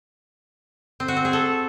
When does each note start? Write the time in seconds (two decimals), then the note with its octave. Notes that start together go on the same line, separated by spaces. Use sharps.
1.00 C4
1.08 F#4
1.17 C4
1.25 G#4
1.33 A4